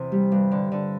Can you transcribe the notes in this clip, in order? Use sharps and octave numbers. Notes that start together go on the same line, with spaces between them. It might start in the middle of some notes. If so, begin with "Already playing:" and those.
Already playing: E2 C3
G3
G2
D3
D3